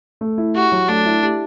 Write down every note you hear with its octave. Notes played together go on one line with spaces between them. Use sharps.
A3
E4
F#4 G4
F#3
A3 D4
E4
G4